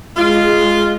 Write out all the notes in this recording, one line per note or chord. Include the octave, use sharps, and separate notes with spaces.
G#3 F4